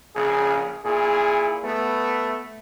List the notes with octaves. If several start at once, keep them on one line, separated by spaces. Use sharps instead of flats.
A#1 C#3 G#4
A#2 E4 G#4
A3 B3